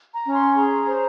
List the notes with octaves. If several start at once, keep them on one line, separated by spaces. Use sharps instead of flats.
A#5
C#4
C6
G#4 A#5
C5